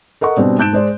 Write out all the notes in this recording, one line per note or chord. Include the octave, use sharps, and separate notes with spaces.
A4 A#4 D#5 F#5 C#6
B2 G3 C4 D4
G#2 A5 F#6 G6 D7 E7
G#3 C5 D5